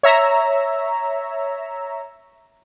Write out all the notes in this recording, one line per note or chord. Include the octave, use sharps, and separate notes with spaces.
C#5 E5 A#5 E6